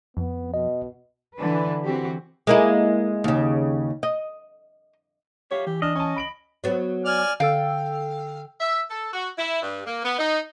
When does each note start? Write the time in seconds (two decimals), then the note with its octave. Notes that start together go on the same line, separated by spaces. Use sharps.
0.17 F2 B3
0.54 B2 D#5
1.37 D3 E3 D4 B4
1.84 E3 C4 F#4 G4
2.47 G#3 A#3 E4
3.24 D#2 C#3
4.03 D#5
5.51 G4 C#5 E5 F5
5.67 E3 G4
5.82 D4 D#5 F6
5.96 C#4 G#5 A5
6.16 B5 D7 F#7
6.64 F#3 B3
7.05 D5 G#5 F6
7.40 D3 A4 F5 G5 E6
8.61 E5
8.90 A4
9.13 F#4
9.39 E4
9.62 G2
9.87 A#3
10.04 B3
10.18 D#4